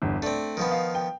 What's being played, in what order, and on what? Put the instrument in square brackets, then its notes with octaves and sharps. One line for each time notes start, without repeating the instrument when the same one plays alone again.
[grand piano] G1 E2
[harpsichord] A3 C4 [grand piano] D4
[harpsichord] D#3 F3 B3
[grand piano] F5
G5